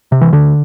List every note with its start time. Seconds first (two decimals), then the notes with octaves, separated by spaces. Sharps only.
0.12 C3
0.21 E3
0.33 D2 D3